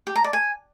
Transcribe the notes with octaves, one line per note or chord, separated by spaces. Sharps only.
G4
A#5
D5
G#5